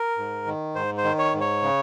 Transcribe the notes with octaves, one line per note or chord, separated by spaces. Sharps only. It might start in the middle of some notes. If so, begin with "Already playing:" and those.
Already playing: A#4
G#2
D#3
G#2 C5
C5
D#3
C#5
G#2
C#5
C#3